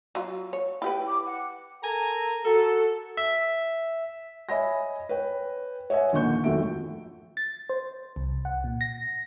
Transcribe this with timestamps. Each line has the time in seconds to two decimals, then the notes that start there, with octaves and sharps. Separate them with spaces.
0.15 F#3 F4
0.53 C#5
0.82 E4 G4 B4 G5
1.07 D6
1.25 F#5
1.82 A4 A#4 G#5 A#5
2.44 F#4 A4
3.17 E5
4.49 C#5 D#5 E5 G#5 B5 A#6
5.09 B4 C#5 G5
5.90 C#5 D#5 E5 F#5 G#5
6.12 A#1 D#2 D3 A#3 C#6 G6
6.44 G#1 F2 F#3 A3 E5 D7
7.37 A6
7.70 C5
8.16 C2
8.45 F#5
8.64 A#2
8.81 A#6